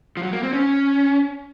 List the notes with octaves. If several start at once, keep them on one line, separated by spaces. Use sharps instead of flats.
F3
F#3
A#3
C4
C#4